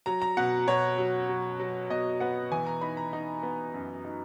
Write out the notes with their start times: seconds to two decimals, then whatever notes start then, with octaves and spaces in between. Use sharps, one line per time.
0.06 F#3 A#5
0.22 A#5
0.37 B2 F#5
0.67 B2 C#5
0.98 F#3
1.29 F#3
1.60 F#3
1.90 B2 D#5
2.20 B3 F#5
2.52 E3 G#5
2.67 A#5
2.81 D#4 B5
2.97 A#5
3.13 D#4
3.43 B3
3.74 F#2
4.05 D#4